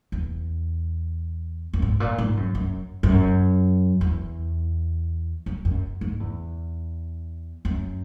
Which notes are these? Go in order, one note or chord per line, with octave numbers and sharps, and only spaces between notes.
E2
F#2
G#2
A#2
G#2
F#2
F#2
F#2
E2
F#2
F#2
G#2
E2
F#2